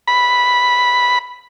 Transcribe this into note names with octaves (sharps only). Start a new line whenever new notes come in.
B5